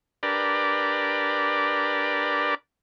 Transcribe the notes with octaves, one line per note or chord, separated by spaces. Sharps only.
D4 G4 A#4 B4 D5